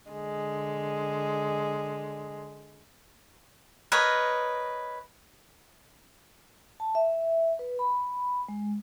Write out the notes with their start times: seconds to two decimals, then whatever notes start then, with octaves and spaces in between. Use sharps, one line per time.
0.11 D3 G#3
3.92 A#4 B4 C#5 D#5
6.80 A5
6.95 E5
7.59 B4
7.79 B5
8.48 G#3